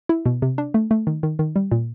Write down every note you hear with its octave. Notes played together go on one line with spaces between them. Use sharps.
E4
B2
C3
D4
A3
A3
D#3
D#3
D#3
G3
A#2